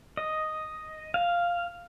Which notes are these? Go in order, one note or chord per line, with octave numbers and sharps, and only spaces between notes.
D#5
F5